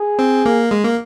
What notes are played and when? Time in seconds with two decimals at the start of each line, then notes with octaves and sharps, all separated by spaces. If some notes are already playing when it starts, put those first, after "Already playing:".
Already playing: G#4
0.19 C4
0.46 A#3
0.71 G#3
0.84 A#3